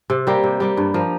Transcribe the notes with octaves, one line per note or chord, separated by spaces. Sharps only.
C3
G3 A#3 G4
C3
G3 A#3 G4
G2
F3 A#3